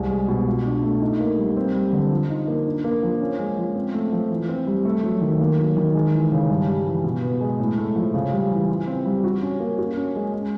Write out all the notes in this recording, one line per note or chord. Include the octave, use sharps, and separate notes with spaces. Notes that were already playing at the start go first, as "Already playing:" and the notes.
Already playing: C2 G#3
G#3
B2
F4
D4
A3
D#4
A#3
G3
C4
G3
D3
F3
D#4
A#3
D4
A#3
F3
C#4
G#3
F3
C4
A3
F3
E3
C4
G3
A3
F#3
D#3
A#3
F#3
D#3
G#3
E3
C#3
G2
G3
E3
B2
B3
G#3
A2
A3
F3
C#3
G3
E3
F4
C4
G3
F#4
C#4
A#3
F#4
C#4
G#3
G#3